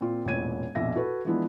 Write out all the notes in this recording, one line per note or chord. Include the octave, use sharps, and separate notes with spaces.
A#2 C4 F4
E1 A1 A#2 C#5 G#6 D#7
A#1 F2 B2 E5 A#6
F#4 A4 B4
E3 F3 G#3 B3 D4 E4